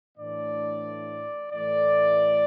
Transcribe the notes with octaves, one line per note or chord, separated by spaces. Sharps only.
A2 E3 A3 D4 D5
A2 E3 A3 D5